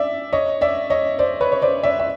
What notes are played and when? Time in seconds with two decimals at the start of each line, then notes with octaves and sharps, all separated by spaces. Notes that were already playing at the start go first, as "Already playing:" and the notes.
Already playing: D5 E5
0.33 C#5 D#5
0.61 D5 E5
0.90 C#5 D#5
1.19 C5 D5
1.41 B4 C#5
1.52 C#5
1.62 C5 D5
1.83 D5 E5
1.99 E5